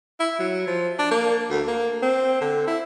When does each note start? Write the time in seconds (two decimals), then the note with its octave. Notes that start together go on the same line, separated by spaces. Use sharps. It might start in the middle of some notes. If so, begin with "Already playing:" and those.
0.20 E4
0.39 F#3
0.67 F3
0.99 D4
1.11 A#3
1.50 D2
1.67 A#3
2.03 C4
2.41 D3
2.67 E4